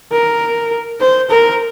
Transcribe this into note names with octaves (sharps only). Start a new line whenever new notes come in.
A#4
C5
A#4